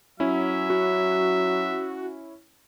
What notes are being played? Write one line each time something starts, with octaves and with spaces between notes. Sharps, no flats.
F#3 C#4 E4 E5
F#4